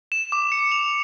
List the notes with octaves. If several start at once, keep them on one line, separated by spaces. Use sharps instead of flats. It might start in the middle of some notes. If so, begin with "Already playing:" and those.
E7
D6
C#7
F7